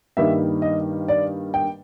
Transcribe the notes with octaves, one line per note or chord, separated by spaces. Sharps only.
G2 D#3 G3 A#3 E5
D#5
D5
G5